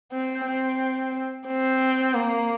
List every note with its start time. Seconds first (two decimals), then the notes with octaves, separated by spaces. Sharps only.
0.12 C4
0.45 C4
1.47 C4
2.14 A#3